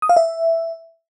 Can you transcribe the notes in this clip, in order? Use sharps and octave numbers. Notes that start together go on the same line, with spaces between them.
D#6
F5
E5